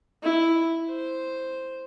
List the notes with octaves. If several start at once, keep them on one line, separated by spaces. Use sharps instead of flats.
E4
C5